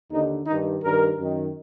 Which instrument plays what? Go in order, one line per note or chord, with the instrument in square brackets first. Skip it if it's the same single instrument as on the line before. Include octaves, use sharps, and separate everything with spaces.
[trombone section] D#2 D3 D#4
G2 D#3 D#4
G2 D#3 A#4
F#2 D#3